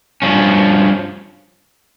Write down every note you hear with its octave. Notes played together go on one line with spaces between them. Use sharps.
G2 F3 C#4